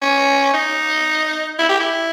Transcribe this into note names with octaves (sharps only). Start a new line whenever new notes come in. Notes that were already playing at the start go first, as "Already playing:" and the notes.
C#4
D#4
E4
G4
E4